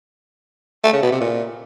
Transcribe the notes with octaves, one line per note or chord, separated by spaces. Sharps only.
A3
C#3
B2
C3
A#2